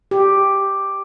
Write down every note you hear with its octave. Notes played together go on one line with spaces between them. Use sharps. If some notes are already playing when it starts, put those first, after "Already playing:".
G4